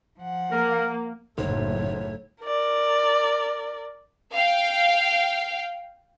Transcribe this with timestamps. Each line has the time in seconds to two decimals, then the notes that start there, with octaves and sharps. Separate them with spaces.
0.19 F3 F#5
0.51 A#3 A#4
1.38 F#1 B1 A2 A3 C5 C#5
2.44 A#4 D5
4.33 F5 G5